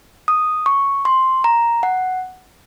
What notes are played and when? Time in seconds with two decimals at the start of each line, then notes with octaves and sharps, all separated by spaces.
0.28 D#6
0.66 C#6
1.05 C6
1.44 A#5
1.83 F#5